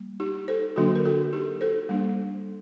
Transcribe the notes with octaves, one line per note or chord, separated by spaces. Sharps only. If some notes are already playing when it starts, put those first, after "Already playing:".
Already playing: G3 A#3
D#4 G4
A4 C5
D3 F#3 A#3 D4 F#4 A4
A#4
F#4 A4
D#4 G4
A4 C5
G3 A#3 D4